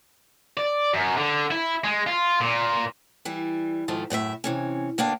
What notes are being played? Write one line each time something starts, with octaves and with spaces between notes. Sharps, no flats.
D5
F#2
D3
E4
G#3
F4
A#2
E3 G3
G#2 D#3 F3 A3
F#2 A2 C5 E5
C3 E3 C#4
D2 A#3 B3 D4 G5